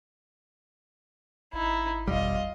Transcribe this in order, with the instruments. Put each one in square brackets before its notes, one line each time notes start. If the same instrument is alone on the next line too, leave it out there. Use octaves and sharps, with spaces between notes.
[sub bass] G#1 [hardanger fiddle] D#4 E4
[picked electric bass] E1 G3 [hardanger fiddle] F4 D#5